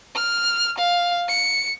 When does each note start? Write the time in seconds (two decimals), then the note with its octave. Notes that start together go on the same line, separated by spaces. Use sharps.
0.15 F6
0.78 F5
1.29 C#7